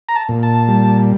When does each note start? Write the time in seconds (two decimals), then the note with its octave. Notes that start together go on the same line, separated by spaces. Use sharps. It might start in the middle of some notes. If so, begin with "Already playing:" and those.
0.09 A#5
0.16 A5
0.29 A#2
0.43 A5
0.68 G3